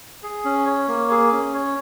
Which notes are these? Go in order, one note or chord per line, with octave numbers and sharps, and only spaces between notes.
G#4
C#4
C#5
A#3
G#4
C#4
C#5